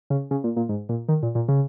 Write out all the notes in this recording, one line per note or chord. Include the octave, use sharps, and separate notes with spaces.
C#3
C#3
A#2
A#2
G#2
A#2
D#3
A#2
A#2
C#3